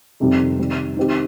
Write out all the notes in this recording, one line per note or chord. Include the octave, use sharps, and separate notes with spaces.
F2 C3 D#3 G3 C4
D#3 G3 C4
D#3 C4 G4